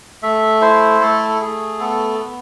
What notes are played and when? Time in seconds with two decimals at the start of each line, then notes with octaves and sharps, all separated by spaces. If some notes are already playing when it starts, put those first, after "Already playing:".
0.23 A3 E5
0.61 E4 C5
1.01 A3 A4
1.41 A3 G#4
1.80 B3 A4
2.19 B3